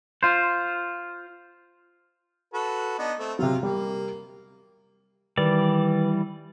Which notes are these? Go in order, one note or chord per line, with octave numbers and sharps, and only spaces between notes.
F4 C5
F#4 A4 B4
B3 D4 D#4
A3 C4
C3 F#3 F4
G3 A#3
D#3 E3 G3 B4 D5